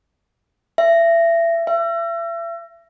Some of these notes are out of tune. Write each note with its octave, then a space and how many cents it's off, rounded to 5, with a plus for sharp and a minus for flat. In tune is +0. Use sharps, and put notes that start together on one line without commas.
E5 +25
E5 +35